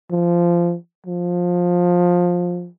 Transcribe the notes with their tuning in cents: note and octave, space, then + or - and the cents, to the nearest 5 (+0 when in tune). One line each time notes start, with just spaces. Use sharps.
F3 -15
F3 +20